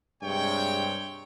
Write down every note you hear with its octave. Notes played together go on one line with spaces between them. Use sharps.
G2 C3 G#3 C#5 G5